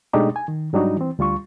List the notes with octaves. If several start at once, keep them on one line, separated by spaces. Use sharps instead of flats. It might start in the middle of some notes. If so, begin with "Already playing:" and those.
B2 G#3 A3 D4 D#4 G4
G#5
D#3
G#2 F#3 G3 D4 D#4 F#4
E3 C4
D2 G3 F4 C#6